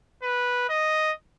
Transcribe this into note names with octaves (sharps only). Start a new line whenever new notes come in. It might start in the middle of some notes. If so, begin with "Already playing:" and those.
B4
D#5